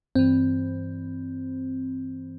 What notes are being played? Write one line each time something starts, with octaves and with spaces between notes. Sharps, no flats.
G2 E3 C4